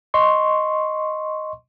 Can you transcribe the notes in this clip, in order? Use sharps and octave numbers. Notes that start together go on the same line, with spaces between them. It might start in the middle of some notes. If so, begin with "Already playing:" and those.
D#5 C6 C#6